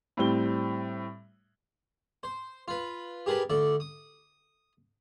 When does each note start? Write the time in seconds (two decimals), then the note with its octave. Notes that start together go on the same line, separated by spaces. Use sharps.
0.17 A2 G3 C4 G7
2.23 C5
2.68 F4 B4
3.26 G4 G#4 A#4 B4 A5
3.50 D2 A4 D5
3.80 D#6